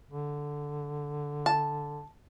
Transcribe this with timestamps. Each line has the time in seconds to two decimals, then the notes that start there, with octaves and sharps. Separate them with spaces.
0.11 D3
1.46 A5